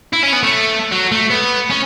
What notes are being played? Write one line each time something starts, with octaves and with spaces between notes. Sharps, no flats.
E4
C#4
B3
A3
F#3
A3
B3
C#4